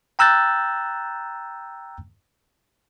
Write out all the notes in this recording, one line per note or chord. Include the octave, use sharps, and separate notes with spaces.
G5 A#5 E6 F#6 G6 A6